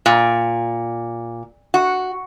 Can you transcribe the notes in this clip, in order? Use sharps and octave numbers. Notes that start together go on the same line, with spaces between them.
A#2
F#4